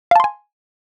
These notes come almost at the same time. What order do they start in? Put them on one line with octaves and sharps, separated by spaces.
F5 A5 C6 G#5